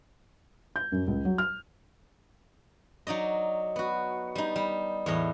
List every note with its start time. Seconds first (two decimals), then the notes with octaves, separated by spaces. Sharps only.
0.76 G6
0.92 F#2
1.07 C#2
1.25 F#3
1.38 F6
3.07 F#3 D#4 D5 D#5
3.76 B3 F#4
4.35 G3 D#4
4.56 G3
5.06 E2 A2 D#5